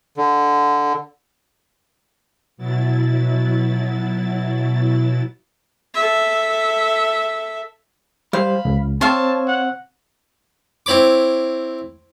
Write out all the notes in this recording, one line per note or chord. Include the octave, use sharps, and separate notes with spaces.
D3
B2 F#3 E4 A6
A4 E5
G3 C5 F5 B5
C#2
C4 C5 C#5 F5 A5
F#5
C4 E4 C#5 B5 D6